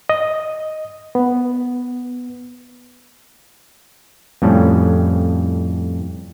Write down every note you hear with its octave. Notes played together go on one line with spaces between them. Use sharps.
D#5
B3
F2 A2 G3 C#4